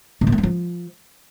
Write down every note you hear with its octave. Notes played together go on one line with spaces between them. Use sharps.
B2
A#2
A3
G2
F3